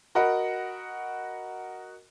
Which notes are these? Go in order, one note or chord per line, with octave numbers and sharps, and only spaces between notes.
F#4 A#4 D#5 F#5 B5